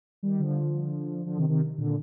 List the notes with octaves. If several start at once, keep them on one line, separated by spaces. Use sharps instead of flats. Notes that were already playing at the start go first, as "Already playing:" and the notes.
D#3 G3
D3 F3
D3 F3
C3 D#3
C3 D#3
A#2 D3